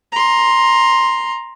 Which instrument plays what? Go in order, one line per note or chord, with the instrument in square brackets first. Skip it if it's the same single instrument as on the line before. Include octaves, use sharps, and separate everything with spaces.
[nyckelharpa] A#5 C6